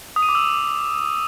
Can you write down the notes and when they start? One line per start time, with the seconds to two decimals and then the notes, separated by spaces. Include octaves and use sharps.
0.16 D#6
0.22 D#7
0.29 D6
0.35 E6